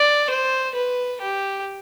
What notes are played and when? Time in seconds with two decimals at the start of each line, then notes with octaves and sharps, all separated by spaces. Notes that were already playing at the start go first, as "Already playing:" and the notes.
Already playing: D5
0.30 C5
0.75 B4
1.20 G4